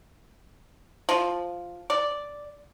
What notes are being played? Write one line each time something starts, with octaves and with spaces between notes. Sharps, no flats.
F3
D5